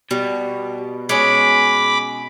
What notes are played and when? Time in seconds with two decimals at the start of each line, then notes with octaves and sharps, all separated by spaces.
0.11 B2 G3
1.09 G#3 C#4 B5 D6